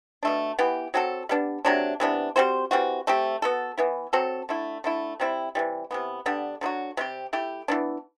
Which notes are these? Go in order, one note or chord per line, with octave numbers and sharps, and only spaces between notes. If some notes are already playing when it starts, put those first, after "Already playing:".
B2 A3 D4
E3 B3 E4 G4
F#3 C4 F#4 A4
G3 B3 D4
C3 F#3 A3 D4
C3 E3 B3 D4
G3 C4 F#4 C5
E3 G3 C4 F#4
A3 C4 G4
B3 F#4 A4
E3 B3 E4
F#3 C4 F#4 A4
D3 A3 E4
D3 A3 E4
C3 G3 C4 E4
C3 E3 G3
C3 E3 B3
D3 G3 B3 D4
D3 F#3 B3 F#4
C3 G3 C4 G4
A3 E4 G4
E3 B3 D4